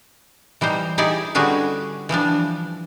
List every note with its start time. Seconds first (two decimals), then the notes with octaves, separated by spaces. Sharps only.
0.61 E3 G3 D#4 C5 A#5
0.98 D#4 E4 G4 G#4 D5
1.35 D3 G3 C#4 F#4 G#4 B4
2.09 E3 F3 G3 D4